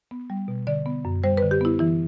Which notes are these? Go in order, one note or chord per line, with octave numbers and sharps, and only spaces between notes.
B3
G3
B2
D3 D5
B3
F#2
G3 C5
B4
D3
G4
B3 E4
E3 E4